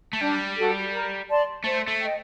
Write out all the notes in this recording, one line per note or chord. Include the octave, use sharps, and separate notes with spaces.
A3
G3 D4
F#4 A4
A#4
D5 A5 C6
A3 C5
A3
D#5 G5